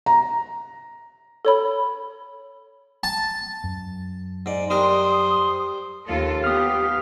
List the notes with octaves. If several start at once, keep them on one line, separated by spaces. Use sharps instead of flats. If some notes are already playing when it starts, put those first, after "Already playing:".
A#5
A4 C#5 B5
A5
F#2
G#2 D5
G3 D4 A#4 C5 D#6
D#2 F4 A4
B3 G4 F5 D#6 F6